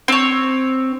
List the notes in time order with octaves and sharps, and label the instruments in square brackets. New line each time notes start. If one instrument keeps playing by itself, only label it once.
[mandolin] C4 C#5